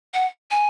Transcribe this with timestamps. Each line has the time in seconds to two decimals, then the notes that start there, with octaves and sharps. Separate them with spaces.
0.13 F#5
0.51 G#5